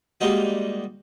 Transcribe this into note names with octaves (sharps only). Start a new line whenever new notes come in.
G3 G#3 A#3 D#4 F#4